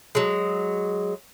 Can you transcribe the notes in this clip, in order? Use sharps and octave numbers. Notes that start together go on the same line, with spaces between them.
F#3 G#3